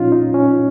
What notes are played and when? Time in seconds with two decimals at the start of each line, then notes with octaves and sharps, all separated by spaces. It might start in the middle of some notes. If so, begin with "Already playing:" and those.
Already playing: A#2 F3 C#4 D#4 F4
0.12 D#4
0.34 C#4